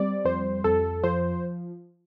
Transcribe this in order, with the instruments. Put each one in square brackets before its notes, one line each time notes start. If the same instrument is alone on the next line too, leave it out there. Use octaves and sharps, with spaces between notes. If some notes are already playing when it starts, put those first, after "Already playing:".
Already playing: [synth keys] G3 C4 D5
F2 C5
F2 A4
F3 C5